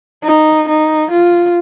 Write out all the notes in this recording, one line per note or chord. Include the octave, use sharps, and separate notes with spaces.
D#4
D#4
F4